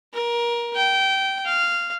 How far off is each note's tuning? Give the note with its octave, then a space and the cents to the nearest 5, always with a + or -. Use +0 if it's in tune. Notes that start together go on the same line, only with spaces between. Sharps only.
A#4 +25
G5 -20
F5 -10